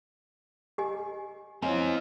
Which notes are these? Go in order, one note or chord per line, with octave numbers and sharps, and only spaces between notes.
G4 D#5 G#5
C4 E4 C#5 D#5 F5 G#5